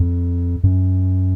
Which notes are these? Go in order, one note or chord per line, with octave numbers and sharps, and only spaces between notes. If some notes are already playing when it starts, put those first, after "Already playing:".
Already playing: F2
F#2